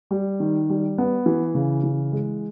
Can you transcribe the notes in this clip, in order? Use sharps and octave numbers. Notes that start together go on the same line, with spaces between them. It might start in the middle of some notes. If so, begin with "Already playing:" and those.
G3
D#3
G3
B3
E3
C#3
E3
G#3